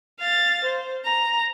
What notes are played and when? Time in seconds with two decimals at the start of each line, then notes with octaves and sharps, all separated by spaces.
0.20 F5 A6
0.65 C5
1.05 A#5